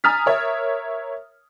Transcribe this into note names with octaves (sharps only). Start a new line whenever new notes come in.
G#5 A#5 D#6 F6 A6 B6
A#4 C#5 E5